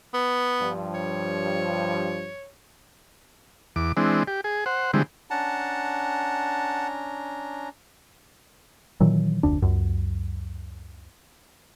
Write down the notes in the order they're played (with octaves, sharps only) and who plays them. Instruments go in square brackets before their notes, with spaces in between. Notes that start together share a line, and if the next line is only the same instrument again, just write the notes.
[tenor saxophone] B3
[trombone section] G2 F3
[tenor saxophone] C#5
[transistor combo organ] E2 D6
E3 G#3 C4 D4
G4
G#4
C5 F#5
D3 E3 G3 G#3 C4
[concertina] C#4 D4 A#5 [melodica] F#5 A5
[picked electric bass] A#2 D#3 E3 F#3
F1 D2 D4
C#2 F#2